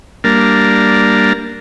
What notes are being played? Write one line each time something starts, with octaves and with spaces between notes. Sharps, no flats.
G3 A#3 D4 A#4